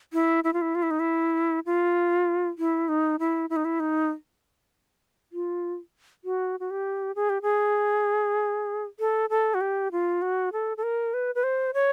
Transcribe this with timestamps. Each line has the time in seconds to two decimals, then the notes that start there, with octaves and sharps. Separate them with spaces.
0.13 E4
0.44 E4
0.53 F4
0.62 E4
0.75 F4
0.83 E4
0.91 D#4
1.00 E4
1.66 F4
2.58 E4
2.89 D#4
3.19 E4
3.50 E4
3.56 D#4
3.65 E4
3.80 D#4
5.32 F4
6.24 F#4
6.60 F#4
6.71 G4
7.16 G#4
7.30 G4
7.42 G#4
9.00 A4
9.30 A4
9.54 F#4
9.61 G4
9.92 F4
10.22 F#4
10.53 A4
10.77 A4
10.83 A#4
11.14 B4
11.35 B4
11.43 C5
11.74 C#5